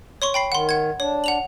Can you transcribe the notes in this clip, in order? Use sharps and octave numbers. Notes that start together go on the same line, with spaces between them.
C#5 C6 C#6
G5 B5 C7
D#3 F#5 C6
F#5 G#6
D4 C#5
F#5 F7 F#7